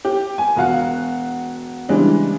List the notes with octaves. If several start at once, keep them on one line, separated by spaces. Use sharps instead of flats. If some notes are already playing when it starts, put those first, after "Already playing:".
G4
G#5
E1 F#4 F5 F#5
C#3 E3 G3 G#3 D4